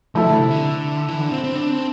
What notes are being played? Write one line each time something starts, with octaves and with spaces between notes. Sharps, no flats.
F3 A3 E4 A4
D3
C3
D3
E3
D3
C4
C4
D4
C4